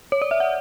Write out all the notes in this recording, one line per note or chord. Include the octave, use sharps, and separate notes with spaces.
C#5
D5
E5
F#5